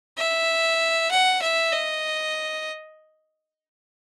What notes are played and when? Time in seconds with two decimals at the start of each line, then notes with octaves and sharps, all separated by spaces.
0.18 E5
1.11 F#5
1.42 E5
1.73 D#5